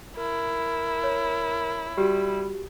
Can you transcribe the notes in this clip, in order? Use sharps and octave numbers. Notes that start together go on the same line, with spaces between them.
E4 A#4
C#5
G3 F#4 G4